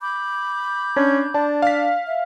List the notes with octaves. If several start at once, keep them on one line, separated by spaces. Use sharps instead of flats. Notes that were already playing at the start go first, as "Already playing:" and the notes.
B5 D6 G6
C#4 D4
D4 A5
F5 B6
E5